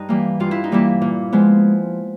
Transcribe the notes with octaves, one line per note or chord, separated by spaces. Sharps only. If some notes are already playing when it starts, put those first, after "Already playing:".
Already playing: G2 D#4
E3 G3 A#3
G2 F4
E4
D#4
E3 G3 A#3 E4
A#2
F3 G#3 B3